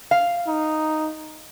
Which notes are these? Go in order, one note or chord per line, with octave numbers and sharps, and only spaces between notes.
F5
D#4